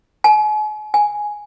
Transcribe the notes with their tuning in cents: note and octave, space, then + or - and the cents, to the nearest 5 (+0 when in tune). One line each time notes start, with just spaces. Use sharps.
G#5 +40
G#5 +5